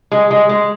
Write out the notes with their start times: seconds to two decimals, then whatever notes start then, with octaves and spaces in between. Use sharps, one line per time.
0.12 G#3
0.31 G#3
0.49 G#3